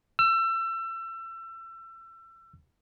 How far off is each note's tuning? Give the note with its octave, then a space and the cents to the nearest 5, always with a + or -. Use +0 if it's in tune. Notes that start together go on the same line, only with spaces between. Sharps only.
E6 +30